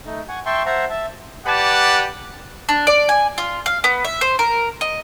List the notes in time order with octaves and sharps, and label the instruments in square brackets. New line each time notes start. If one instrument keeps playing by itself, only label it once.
[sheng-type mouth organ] A3 D#4
F#5 G#5 C#6
E5 G5 A5 C6 C#6
C5 E5 F#5 A5 A#5
E5 A5
[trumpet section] G4 B4 D5 F#5 A5
[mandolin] D4
D5
G#5
F4
F5
B3
E5
C5
A#4
D#5